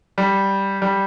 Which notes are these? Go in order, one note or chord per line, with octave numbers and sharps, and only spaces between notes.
G3
G3